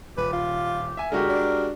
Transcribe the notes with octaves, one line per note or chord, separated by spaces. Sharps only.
D#1 G4 B4
F4
E5 G#5
D3 G#3 F#4 G4 A#4
D4